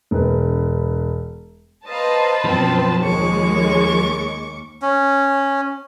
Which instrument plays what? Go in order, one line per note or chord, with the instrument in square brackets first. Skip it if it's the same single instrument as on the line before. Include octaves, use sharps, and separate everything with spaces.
[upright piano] E1 B4
[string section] B4 C5 A5 [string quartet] D#5 F5 A#5
[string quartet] F#2 B2 C4 [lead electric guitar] F3
[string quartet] D#2 C#6 D6 [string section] D#3 G#3 C#5
[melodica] C#4